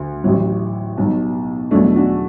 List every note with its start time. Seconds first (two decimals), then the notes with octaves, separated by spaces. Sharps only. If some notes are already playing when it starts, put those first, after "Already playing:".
Already playing: D2
0.24 A1 A2 F#3
0.97 B1 B2 F#3
1.71 E2 B2 F#3 A3 D4
1.96 D4 F#4